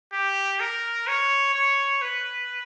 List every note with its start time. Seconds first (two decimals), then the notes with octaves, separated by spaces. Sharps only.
0.12 G4
0.60 A#4
1.07 C#5
1.54 C#5
2.02 B4